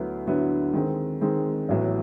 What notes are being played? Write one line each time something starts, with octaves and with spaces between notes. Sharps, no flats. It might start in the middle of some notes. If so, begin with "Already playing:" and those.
Already playing: D2 D3 F#3 B3 E4
D2 D3 F#3 B3 E4
D#3 G#3 C4
D#3 G#3 C4
A1 A2 F#3 B3